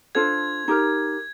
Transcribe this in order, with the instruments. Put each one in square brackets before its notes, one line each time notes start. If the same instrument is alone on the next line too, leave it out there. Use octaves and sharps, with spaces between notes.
[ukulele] D4 F4 A4 C5 [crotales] G#6
[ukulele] D#4 G4 A#4